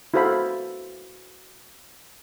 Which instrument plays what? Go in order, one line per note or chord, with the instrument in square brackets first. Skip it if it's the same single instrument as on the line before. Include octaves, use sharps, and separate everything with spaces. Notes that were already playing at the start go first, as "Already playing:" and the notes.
[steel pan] E4 F#4 A4 C5 F5 B5